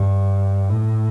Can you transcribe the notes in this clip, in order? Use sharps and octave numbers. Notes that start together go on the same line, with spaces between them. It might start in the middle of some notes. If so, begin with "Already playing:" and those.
Already playing: G2
A2